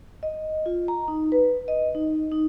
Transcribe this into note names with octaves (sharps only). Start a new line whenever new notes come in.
D#5
F4
A#5
D#4
B4
D#5
D#4
D#4